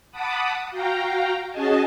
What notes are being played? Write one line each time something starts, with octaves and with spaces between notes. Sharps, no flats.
F#5 A5 B5 D6 D#6
F#4 F5 G5 A#5
C#4 F#4 G#4 D#5 G#5 A5